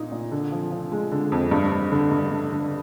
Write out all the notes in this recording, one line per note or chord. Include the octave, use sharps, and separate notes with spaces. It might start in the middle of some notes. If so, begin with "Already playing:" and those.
Already playing: A#2 D#4
A#2
D3
F3
F3
G#3
D3
F2
G2
G2
D3
G2
G2
D3